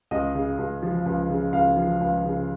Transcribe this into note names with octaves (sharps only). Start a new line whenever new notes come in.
C#2 D#5
C#3
C#2
F3
C#2
C#3
C#2 F5
F3
C#2
C#3